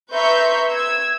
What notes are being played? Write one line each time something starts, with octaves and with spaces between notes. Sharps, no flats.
B4 E5 A#5 C6 C#6 G6
E6 G#6